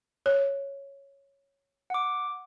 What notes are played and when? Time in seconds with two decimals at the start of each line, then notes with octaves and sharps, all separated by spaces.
0.26 C#5
1.90 F#5 D6